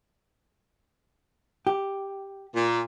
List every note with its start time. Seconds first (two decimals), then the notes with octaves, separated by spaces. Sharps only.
1.67 G4
2.55 A#2